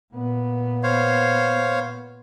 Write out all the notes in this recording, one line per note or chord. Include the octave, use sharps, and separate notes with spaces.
A#2 B3
C5 C#5 F5